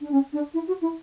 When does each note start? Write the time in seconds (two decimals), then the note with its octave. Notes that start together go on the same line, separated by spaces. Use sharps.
0.01 D4
0.11 C#4
0.33 D4
0.54 E4
0.67 F#4
0.81 E4